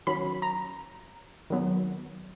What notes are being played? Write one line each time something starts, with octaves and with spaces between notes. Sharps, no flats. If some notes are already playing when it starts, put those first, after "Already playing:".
D#3 F#3 C#4 B5
A#5
D#3 F#3 B3